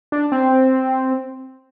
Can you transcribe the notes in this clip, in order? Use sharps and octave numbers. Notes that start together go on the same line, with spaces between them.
D4
C4